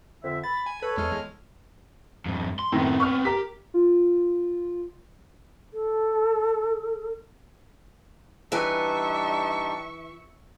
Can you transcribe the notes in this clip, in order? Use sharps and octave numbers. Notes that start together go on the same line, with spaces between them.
F2 D3 E5
B5 A6
G#5
A4 B4 C#5
E2 G#3 F6
F2 G#2
C6
F#2 A2 D#3 B3 C4
C#6 F6
G4 A#4 B6
F4
A4
E3 G3 D4 D#4 B4 E5 G#5 C#6